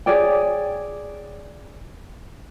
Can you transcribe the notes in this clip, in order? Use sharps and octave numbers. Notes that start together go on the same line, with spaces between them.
G#4 C#5 D5 G5